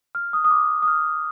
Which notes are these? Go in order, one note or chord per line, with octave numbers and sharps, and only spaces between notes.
F6
D#6
D#6
D6
D#6
F6